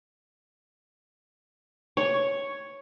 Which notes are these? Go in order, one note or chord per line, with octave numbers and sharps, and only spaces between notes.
C#5